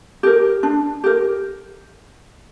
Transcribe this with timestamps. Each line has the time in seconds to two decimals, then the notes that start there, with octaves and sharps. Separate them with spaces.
0.23 G4 A#4
0.63 D4
1.04 G4 A#4